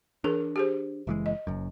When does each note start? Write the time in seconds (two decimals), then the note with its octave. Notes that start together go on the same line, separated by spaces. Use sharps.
0.24 E3 D4 G#4 A#4
0.56 G4 G#4 C5
1.07 F#1 E3 G#3
1.26 D#5
1.47 F#1 F#2